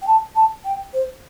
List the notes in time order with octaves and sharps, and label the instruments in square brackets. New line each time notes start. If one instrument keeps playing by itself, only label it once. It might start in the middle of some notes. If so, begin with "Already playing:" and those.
[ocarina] G5
A5
A5
G5
C5